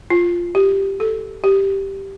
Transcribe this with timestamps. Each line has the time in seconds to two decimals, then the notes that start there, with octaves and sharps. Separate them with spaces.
0.10 F4
0.55 G4
1.00 A4
1.44 G4